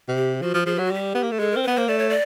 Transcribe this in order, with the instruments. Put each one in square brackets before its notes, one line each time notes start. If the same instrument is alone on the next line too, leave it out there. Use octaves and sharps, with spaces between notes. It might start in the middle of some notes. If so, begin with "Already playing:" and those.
[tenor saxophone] C3
[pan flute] G4
[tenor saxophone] F3 [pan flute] F#4
[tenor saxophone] F3
[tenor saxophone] F3 [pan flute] G#4
[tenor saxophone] F#3 [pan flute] G4
[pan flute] F#4
[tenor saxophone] G3 [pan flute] G4
[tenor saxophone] B3
A#3
A3
[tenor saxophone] G#3 [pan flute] A4
[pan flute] A#4
[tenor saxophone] C4
[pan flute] B4
[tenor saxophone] B3
[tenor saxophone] A#3 [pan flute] C5
[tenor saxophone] A3 [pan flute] D5
[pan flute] C#5
D5